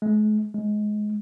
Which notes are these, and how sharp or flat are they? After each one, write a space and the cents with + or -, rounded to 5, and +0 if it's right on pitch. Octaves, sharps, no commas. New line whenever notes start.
G#3 +45
G#3 +20